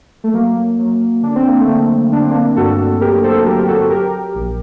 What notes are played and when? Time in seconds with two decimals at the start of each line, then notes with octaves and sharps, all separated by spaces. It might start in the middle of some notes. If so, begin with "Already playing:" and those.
0.24 A3
0.33 F#3 A#3
0.79 F#3
1.23 D3 D4
1.36 C4
1.47 A#3
1.60 A3 C4
1.67 D3
2.12 D3 D4
2.22 C4
2.31 A#3 D4
2.56 G2 F#4 A4
3.01 F#3 G4 A#4
3.24 A4 C5
3.46 F#3 G4 A#4
3.67 F#4 A4
3.90 F#3 G4 A#4
4.35 A#1